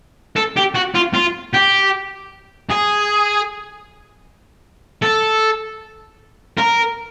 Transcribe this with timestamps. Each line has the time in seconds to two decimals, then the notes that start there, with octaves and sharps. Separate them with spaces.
0.36 A4
0.56 G4
0.75 F#4
0.95 F4
1.14 F4
1.53 G4
2.70 G#4
5.03 A4
6.57 A#4